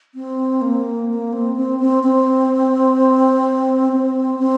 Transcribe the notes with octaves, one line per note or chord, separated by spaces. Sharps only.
C4
A#3
A#3
C4
C4
C4
C4
C4
C4